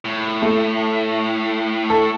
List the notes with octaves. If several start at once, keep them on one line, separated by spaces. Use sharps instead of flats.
A2
A3
A4